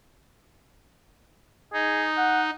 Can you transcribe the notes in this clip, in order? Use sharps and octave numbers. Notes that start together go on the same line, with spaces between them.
D#4 G#4
F#5